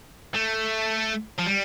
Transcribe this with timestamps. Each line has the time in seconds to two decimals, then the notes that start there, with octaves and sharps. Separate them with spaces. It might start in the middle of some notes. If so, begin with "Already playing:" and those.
0.35 A3
1.38 F3
1.46 G3